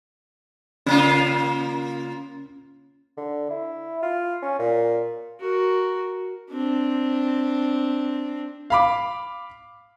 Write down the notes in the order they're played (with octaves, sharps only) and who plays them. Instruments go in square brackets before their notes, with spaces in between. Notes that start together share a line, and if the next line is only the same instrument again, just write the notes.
[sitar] C#3 A#3 F4 [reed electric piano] C#4
[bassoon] D3
E4
F4
C#4
A#2
[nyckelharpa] F#4 A#4
C4 D4
[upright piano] F5 B5 D6